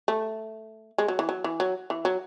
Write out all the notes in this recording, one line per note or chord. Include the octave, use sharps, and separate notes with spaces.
A3
G#3
F#3
E3
F#3
E3
F#3
E3
F#3